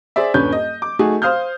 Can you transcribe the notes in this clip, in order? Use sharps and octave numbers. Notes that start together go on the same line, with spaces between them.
G#4 C5 D5 E5
D#1 G2 C#4 B4 G6
D#5
D6
A3 D#4 F#4 G#4
C5 F5 D#6 F6 G6